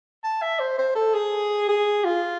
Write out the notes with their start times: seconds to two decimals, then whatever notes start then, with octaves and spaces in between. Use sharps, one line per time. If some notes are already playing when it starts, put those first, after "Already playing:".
0.24 A5
0.42 E5
0.60 C5
0.78 C5
0.95 A4
1.14 G#4
1.68 G#4
2.04 F4